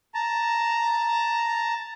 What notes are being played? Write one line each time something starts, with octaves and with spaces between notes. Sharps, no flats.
A5 A#5